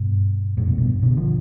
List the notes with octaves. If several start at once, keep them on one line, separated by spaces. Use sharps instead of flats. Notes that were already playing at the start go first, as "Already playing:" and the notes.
Already playing: G2 B2
F2 A2
G2 B2
G2 B2
B2 D3
D3 F3